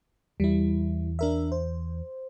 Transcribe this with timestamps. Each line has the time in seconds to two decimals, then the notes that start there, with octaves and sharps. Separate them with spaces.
0.40 E2 G3 E4
1.19 D4 A#4 E5
1.52 C5